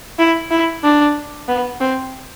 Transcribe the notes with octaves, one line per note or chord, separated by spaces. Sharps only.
E4
E4
D4
B3
C4